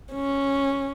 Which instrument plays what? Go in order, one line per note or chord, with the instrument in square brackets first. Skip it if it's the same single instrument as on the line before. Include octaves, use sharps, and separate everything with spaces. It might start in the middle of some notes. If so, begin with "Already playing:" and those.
[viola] C#4